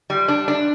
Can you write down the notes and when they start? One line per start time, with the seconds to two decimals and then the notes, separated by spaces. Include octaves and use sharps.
0.10 G3
0.28 D4
0.48 D4